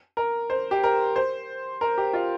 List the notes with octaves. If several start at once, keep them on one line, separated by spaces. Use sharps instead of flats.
A#4
C5
G4
A#4
C5
A#4
G4
F4